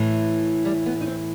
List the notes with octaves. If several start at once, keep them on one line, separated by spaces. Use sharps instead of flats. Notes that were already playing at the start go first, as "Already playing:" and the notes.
Already playing: A2 E3
G3
B3
D#4
C4